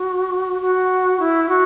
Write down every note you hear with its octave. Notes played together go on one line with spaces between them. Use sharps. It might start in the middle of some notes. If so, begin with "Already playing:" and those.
Already playing: F#4
F#4
E4
F#4